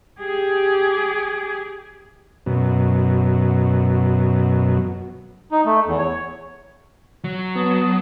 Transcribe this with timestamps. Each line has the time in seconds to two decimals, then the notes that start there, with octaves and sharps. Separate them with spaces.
0.20 G4 G#4
2.46 F#2 B2
5.52 D#4
5.66 A3
5.86 E2
5.98 C#5
7.24 F#3
7.56 B3 A5 D#6